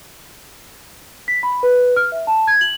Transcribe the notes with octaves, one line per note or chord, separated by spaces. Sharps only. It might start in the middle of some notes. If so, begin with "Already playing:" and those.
B6
B5
B4
F6
E5
A5
G#6
F#7